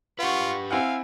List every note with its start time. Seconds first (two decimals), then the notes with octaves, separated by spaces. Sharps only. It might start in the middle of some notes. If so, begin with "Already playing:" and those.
0.19 F4 G4 B4 F#5 C#6
0.71 C4 E4 F5 F#5 G#5